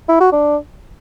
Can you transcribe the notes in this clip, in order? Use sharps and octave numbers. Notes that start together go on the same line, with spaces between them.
E4
F#4
D4